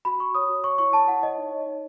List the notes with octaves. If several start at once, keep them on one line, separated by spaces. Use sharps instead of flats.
F#4 B5
F#4 C#6
C#5 D#6
F#4
C#5 C#6
E4 C#6
C#5 A5
E4 F#5
C#5 D#5
D#4
C#5
D#4